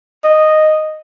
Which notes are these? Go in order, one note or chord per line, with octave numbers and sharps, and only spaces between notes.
D#5